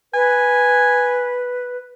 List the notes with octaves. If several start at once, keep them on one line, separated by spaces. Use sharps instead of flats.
B4 G#5